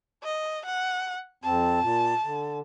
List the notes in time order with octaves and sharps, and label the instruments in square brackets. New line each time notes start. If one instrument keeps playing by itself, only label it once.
[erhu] D#5
F#5
[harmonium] F2 C4 [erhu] A5
[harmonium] A#2
D3